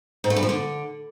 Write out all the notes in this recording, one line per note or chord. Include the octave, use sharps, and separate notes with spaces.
G#2
A3
G2
F3
D3